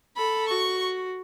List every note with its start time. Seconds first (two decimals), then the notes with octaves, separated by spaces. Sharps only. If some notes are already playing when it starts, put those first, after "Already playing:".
0.17 A4 B5
0.49 F#4 C#6